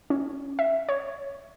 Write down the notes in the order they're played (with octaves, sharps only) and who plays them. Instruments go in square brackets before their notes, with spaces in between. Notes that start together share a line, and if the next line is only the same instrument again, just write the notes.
[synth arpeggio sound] C#4
E5
C#5